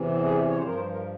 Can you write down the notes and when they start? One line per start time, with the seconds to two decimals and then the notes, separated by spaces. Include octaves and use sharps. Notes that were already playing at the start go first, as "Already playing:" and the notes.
Already playing: E2 C3 E3
0.22 G#4
0.48 C#5
0.57 G2 F3 C5
0.67 A#4
0.75 C5
0.93 A#4